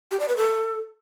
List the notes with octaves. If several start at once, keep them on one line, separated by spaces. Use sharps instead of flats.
G4
D5
B4
A4